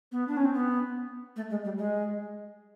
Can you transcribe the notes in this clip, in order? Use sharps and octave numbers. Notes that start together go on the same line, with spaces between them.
B3
D4
C#4
C4
B3
A3
G#3
G3
G#3